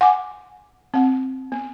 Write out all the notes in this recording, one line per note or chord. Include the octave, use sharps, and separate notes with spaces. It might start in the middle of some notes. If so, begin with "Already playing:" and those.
F#5 G#5 D6
C4 F#5
B3